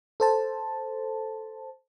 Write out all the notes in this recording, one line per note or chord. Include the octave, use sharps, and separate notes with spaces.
A4 C5 A5